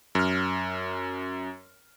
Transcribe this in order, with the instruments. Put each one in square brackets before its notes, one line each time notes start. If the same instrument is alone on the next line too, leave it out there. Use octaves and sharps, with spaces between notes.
[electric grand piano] F#2 F6